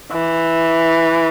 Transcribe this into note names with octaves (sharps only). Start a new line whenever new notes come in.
E3